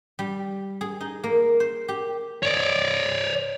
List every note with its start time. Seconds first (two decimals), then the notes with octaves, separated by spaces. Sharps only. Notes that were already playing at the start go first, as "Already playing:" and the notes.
0.19 G3
0.81 G#4
1.01 D#4
1.24 A#3
1.60 C5
1.88 G4
2.43 C#5 D5